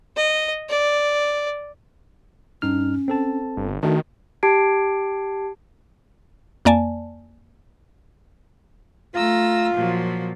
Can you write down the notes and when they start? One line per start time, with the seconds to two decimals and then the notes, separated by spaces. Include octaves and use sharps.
0.17 D#5
0.69 D5
2.62 G2 C#4 D#4 F6
3.08 C4 A4 A5
3.57 G1
3.83 D#3 A3 D4 F#4
4.43 G4 A5 G#6 C7 D7
6.65 F2 A#3 D5 G#5 A5
9.15 A3 F4 A#5 E6
9.75 A#2 F3 F#3